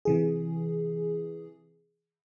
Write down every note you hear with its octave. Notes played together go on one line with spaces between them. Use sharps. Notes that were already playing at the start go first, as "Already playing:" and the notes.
C3 E3 G#4